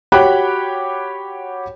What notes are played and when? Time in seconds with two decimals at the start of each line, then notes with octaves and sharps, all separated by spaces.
0.12 F#4 G4 C#5 G5 B5 F#6